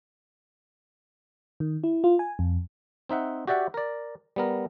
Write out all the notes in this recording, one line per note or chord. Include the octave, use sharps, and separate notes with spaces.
D#3
E4
F4
G#5
F2
C4 D#4 E5 F#5
F#4 G4 D5 E5 F#5
A#4 D5
G3 B3 A#4